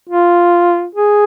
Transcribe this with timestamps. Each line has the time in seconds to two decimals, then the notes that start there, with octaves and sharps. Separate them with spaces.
0.10 F4
0.95 G#4